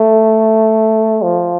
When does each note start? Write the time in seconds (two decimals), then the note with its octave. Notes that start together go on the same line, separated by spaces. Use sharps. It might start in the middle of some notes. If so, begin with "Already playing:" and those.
Already playing: A3
1.22 F3